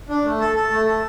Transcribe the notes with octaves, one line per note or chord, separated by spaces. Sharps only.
D4
A3
A4
A4
A3
A4